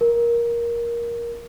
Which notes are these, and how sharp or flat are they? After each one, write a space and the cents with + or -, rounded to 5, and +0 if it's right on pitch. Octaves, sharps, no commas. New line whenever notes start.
A#4 +15